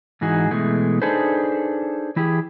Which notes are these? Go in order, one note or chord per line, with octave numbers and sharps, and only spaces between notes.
G#2 E3 D#4 F#4 G#4
B2 E3 G#3 A3
D4 D#4 G#4 A4 B4 C5
E3 E4 G4 G#4